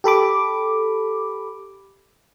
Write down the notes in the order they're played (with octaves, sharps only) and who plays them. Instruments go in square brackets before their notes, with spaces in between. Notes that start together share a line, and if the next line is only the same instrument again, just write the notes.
[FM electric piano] G4 A4 B5 D6